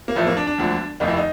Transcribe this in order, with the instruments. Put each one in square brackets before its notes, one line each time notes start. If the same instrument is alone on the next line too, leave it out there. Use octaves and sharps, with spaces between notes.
[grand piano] A#3
A1 A2 F3 A3
A#3
D4
D4
E1 D2 D3 F3
F1 D#2 D#3 D#4
E4
D#4